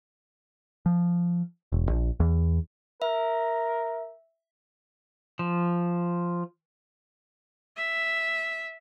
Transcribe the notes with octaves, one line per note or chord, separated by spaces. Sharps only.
F3
E1
A#1
E2
A#4 E5
F3
E5